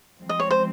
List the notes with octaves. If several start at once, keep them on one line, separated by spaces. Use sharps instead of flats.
F3 G#3 C4
D#5
C#5
C5